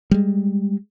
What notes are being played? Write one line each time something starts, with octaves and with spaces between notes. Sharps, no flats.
G3 G#3